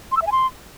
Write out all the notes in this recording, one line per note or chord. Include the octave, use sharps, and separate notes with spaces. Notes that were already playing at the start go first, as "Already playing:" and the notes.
C6
E6
E5
G#5
C6